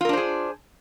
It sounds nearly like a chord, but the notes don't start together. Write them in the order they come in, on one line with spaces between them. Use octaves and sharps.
F4 A#4 D4 C5 G#4